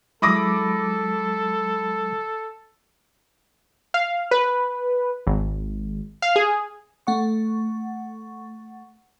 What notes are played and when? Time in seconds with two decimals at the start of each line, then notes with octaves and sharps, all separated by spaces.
0.22 F#3 G#3 E4 A4 B5 D6 D#6 A#6
3.94 F5
4.31 B4
5.27 G#1
6.22 F5
6.36 G#4
7.07 A3 F#5 C#6